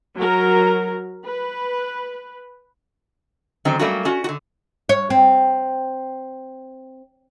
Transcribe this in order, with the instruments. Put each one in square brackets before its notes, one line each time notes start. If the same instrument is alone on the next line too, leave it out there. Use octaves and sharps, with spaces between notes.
[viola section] F#3 A#4
B4
[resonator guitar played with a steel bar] D3 D#3 F#3 C4 C#4
F#3 G3 A3 A#3 C#4 F#4
C#4 F#4
D3 F#4
[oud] C#5
C4